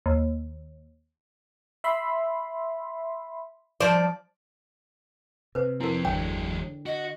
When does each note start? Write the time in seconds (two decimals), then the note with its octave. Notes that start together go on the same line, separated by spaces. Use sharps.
0.06 D#2
1.84 E5 B5 C6
3.80 F3 C5 D5
5.55 C3 B4 C5
5.81 F3 C4 E4 A#4
6.05 G1 E2 D3 F#3 G#3 C#5 G5
6.62 D3
6.86 F#4 D#5